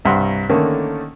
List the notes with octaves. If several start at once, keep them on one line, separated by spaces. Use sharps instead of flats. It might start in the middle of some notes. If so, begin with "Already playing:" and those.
C2 G2 F#5 C6
D3 D#3 A3 A#3 C#4